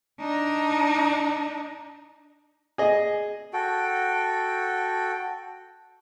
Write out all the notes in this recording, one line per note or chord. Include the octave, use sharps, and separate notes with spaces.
D4 D#4
G#4 D#5
F#4 A4 G5